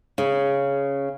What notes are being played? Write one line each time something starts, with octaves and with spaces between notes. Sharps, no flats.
C#3